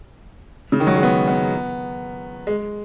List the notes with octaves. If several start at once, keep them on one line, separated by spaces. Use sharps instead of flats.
C#3
D#3
F#3
G#3
B3
B3
G#3